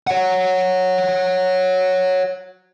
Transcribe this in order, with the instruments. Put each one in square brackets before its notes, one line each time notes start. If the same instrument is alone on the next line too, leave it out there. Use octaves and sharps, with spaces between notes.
[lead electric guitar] C#5 F#5